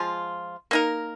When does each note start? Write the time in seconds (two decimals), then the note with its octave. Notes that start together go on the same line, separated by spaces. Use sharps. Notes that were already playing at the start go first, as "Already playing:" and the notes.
Already playing: F3 G#3 F4
0.71 A#3 D#4 A#4